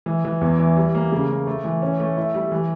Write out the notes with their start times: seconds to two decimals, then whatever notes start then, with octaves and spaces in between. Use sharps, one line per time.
0.06 E3
0.25 E3
0.41 E2
0.59 E3
0.76 G3
0.95 A#3
1.12 C#3
1.30 A#3
1.47 A3
1.65 E3
1.82 C#4
2.00 A3
2.17 E4
2.34 G3
2.52 E3